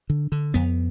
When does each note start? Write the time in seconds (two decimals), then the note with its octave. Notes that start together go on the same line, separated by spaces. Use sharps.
0.10 D3
0.32 D3
0.54 F2 B3